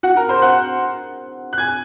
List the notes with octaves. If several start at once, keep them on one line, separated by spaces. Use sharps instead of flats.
F#4 F#5
A#4 A#5
C5 C6
F#5 F#6
F#6
G#5 G#6